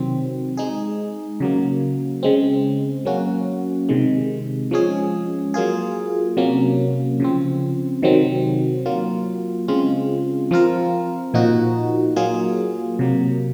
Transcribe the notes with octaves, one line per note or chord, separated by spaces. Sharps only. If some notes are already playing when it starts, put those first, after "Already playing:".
Already playing: C3 D#3 F#3 C4
G#3 D#4 G#4
C#3 F#3 A#3
C#3 G#3 C4
F#3 A#3 C#4 F#4
C3 D#3 G#3
F3 G#3 C#4 G#4
F#3 A#3 F4 G#4
C3 F#3 A#3 C#4
C#3 F3 C4
C3 D#3 F#3 C4
F#3 A#3 F4
C#3 G#3 C4 F4
F3 C4 F4 A#4
A#2 F3 A#3 D#4 F#4
F#3 A#3 F4 G#4
C3 F#3 A#3